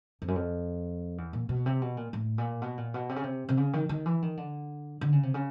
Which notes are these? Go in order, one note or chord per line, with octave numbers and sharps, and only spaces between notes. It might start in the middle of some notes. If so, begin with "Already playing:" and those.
F2
F#2
F2
E2
A#2
B2
C3
B2
A#2
A2
A#2
B2
A#2
B2
C3
C#3
C3
C3
C#3
D#3
D#3
E3
D#3
D3
D3
C#3
C3
C#3